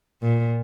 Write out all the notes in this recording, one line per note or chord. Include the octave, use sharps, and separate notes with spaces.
A#2